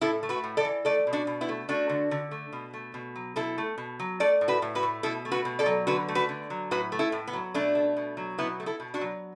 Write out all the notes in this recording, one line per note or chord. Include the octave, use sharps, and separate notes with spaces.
A2 E4 A4
A3
F#4 B4
A2
A4 D5
E3
A3 A4 D5
B2
D4 F#4
B2
B3 E4
A3
A3 D4 F#4
D3
D3
A3
B2
A3
B2
F#3
B2 E4 A4
A3
B2
F#3
A3 A4 D5
A2
F#4 B4
A2
F#4 B4
A3
B2 E4 A4
A3
F#4 B4
B2
A4 D5
F#3
D3 F#4 B4
A3
F#4 B4
D3
F#3
A2 F#4 B4
A3
E4 A4
A2
B3
F#3
B2 A3 D4
A3
B2
F#3
B2 B3 E4
A3
E4 A4
B2
D4 F#4
F#3